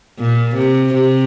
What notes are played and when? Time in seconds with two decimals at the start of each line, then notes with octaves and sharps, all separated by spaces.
0.19 A#2
0.56 C3
0.94 C3